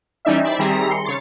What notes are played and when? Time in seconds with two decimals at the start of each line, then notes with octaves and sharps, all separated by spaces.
0.25 E3 G3 C#4 D#4 D5 E5
0.44 C5 D5 E5 B5
0.59 D#3 G3 C4 G#4 E5 A#5
0.90 C6 C7 C#7
1.05 C#3 C#5 A6